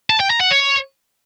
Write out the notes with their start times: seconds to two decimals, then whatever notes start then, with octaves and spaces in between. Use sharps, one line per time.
0.10 A5
0.20 G5
0.30 A#5
0.41 F#5
0.51 C#5